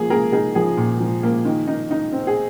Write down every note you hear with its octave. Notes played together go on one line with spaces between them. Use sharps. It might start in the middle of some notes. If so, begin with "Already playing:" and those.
Already playing: F3 A#3 G#4
A#3 G#4 A#4
D#4 G#4 A#4
F3 G#4
A#2
F3
A#3
D#3
D#4
D#4
C4
G#4